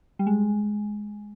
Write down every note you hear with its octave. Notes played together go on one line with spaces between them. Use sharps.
G3
G#3